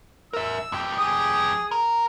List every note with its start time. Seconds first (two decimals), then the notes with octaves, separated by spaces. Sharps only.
0.33 A#4 E5 E6
0.72 F2 G4
0.98 G#4 D#6
1.71 A#4